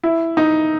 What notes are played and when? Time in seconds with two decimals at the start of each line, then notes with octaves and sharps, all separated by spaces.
0.03 E4
0.37 D#4